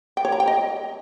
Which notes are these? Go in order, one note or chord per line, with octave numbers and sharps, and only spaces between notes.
G5
C#5
A#5
G5
D#5